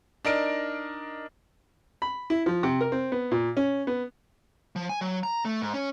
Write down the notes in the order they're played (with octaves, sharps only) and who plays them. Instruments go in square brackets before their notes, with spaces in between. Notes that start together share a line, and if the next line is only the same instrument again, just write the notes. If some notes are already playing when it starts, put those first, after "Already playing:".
[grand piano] D4 D#4 A#4 D7
[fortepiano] B5
E4
F3
C3
A#4
C4
B3
A#2
C#4
B3
[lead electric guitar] F3
G#5
F#3
A#5
A3
G#2
C#4